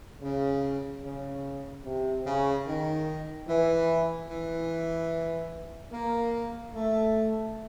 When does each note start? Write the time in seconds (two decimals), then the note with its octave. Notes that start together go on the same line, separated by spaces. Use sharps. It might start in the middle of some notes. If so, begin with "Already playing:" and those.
0.22 C#3
1.03 C#3
1.85 C3
2.26 C#3
2.67 D#3
3.48 E3
4.29 E3
5.93 A#3
6.74 A3